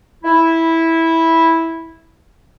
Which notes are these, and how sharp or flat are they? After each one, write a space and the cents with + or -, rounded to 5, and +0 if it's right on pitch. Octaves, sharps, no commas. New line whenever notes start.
E4 -10